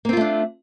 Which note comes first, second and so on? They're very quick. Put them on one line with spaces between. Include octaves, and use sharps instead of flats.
A#3 C4 F4 A3 D4